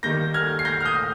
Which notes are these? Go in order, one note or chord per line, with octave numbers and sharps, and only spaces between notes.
D#3 G3 A#3 G6 A#6
F6 G#6
C7
G6 A#6
F6
D#6 G6